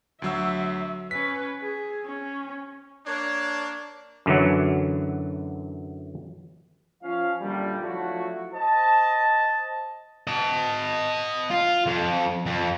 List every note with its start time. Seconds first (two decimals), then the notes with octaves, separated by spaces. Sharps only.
0.22 D2 F#3 E5 E6
1.11 C#4 B4 B6
1.61 G#4
2.05 C#4
3.06 A#3 D4 C#5
4.26 F#2 D3 E3 F#3
7.03 F3 C#4 F5
7.40 F#2 A#2 D3 D#3 G3
7.81 F3 F#3 A3 D4 E4 F#4
8.54 C5 D#5 A5
10.27 D#5 A5
11.51 F4
11.87 F2
12.46 F2